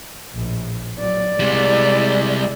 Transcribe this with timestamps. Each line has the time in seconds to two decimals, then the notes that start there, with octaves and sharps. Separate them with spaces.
0.32 A#1 A2
0.99 F#3 D5
1.40 C3 G3 G#3 E4